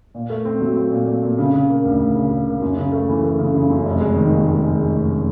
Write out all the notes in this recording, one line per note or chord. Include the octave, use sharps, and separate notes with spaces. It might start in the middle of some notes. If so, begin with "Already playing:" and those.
A#2
A3
C4
F#3
C4
A#2
A#2
A#2
C#3
C#3
A#3
D2
D2
C#3
C#3
A#3
F#2
C#3
A3
E3
A3
C#3
C#3
F#2
F1
G#3
D#3
D#2
G#3
G#3
G#3
F1